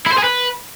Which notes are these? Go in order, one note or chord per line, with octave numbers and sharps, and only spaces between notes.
E4
C5
G#4
B4